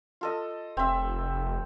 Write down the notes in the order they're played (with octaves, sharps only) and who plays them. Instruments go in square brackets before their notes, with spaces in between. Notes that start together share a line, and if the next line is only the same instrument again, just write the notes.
[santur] F4 A4 D#5
[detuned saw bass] F1 [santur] C4 E5